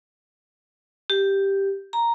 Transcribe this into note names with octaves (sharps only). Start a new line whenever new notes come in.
G4
A#5